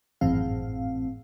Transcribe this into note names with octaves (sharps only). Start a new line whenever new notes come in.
G#1 F#2 A2 E3 C4 F5